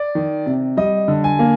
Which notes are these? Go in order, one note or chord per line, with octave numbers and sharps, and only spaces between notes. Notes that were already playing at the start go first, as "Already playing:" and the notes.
Already playing: D5
D#3
C3
G3 D#5
D3
G#5
A#3